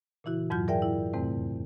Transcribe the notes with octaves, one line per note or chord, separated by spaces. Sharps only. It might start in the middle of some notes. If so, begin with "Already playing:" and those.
A#2 C#3 E3 E4 F#4
F2 G#2 F#3 F4 G6
G#4 A#4 D5 E5 G5 G#5
E4
E2 G#2 C3 A3 C4